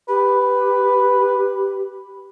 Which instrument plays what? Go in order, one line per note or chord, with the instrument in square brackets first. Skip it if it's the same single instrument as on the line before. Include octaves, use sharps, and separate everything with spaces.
[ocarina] G4 [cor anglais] B4